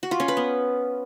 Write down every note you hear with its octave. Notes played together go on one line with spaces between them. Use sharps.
F#4
F4
C#4
B4
B3